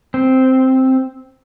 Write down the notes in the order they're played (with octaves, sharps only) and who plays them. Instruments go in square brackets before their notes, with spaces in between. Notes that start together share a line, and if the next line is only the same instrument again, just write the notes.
[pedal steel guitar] C4